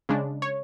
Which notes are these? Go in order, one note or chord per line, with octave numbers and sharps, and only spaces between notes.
C#3 G#3 D4
C#5